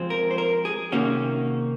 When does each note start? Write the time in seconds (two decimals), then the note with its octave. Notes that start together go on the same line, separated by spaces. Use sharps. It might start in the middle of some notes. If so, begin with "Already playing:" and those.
Already playing: F3 G#3 C4
0.10 A#4
0.31 C5
0.38 A#4
0.65 G#4
0.92 C3 D#3 A#3 C#4 F#4